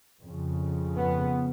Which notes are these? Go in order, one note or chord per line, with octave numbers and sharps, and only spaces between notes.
F2 C#3
B3